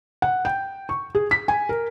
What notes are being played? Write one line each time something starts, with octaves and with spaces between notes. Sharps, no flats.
F#5
G5
C#6
G#4
B6
G#5
A#4